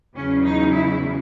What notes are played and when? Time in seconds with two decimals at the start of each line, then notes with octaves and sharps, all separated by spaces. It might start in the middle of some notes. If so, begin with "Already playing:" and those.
0.15 E2 C#3 F#3 C#4
0.44 D#4
0.73 E4